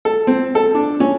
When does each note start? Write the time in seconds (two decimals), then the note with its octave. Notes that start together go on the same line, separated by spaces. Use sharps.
0.05 A4
0.27 C4
0.55 A4
0.75 D4
1.00 C#4